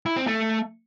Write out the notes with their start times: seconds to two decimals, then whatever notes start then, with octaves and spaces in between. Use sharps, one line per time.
0.06 E4
0.17 C4
0.27 A3